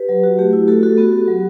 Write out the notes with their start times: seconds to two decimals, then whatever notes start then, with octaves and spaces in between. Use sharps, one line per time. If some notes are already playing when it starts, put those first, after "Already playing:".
Already playing: G4 B4
0.09 F#3
0.24 F#4
0.38 A3 G4
0.53 E4
0.68 A3 F#4 A4
0.83 F#4 A4
0.98 B3 F#4
1.13 F#4 G4
1.28 F#3